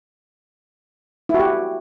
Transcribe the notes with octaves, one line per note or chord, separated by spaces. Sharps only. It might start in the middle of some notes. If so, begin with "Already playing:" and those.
E4 F#4 G4